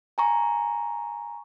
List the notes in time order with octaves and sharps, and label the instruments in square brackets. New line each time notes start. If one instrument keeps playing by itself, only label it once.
[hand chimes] G#5 A#5 C#6